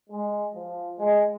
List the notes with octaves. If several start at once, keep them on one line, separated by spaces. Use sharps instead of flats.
G#3
F3
G#3